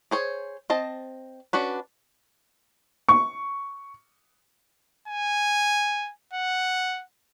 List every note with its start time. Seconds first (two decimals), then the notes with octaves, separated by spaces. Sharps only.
0.11 G#4 C5 C#5
0.70 C4 D#5 A5
1.53 C#4 D4 F#4 B4
3.09 C#6
5.08 G#5
6.33 F#5